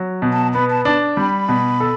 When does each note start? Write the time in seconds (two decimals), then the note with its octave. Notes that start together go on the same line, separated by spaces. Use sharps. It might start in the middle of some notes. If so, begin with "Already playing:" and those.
Already playing: F#3
0.22 B2
0.33 A5
0.54 B3 B5
0.70 A5
0.85 D4 A5
1.17 G3 B5
1.49 B2
1.80 A4